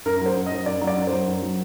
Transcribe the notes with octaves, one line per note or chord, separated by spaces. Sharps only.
F#2 A#4
F#3 C5
F#2
D#5
F#3
F#2 D5
F#3
D5
F#2
C5
F#3
F#2
F#3